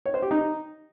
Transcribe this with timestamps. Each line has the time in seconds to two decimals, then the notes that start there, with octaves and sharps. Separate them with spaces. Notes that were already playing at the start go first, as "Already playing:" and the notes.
0.06 C#5
0.14 C5
0.22 G4
0.31 D#4